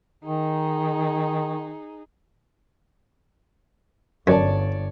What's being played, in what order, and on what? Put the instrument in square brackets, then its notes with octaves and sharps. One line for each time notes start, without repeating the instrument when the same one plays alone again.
[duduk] D#3 [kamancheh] D#4 G#4
[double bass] G1 [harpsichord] F#2 [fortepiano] C#5 D5 A5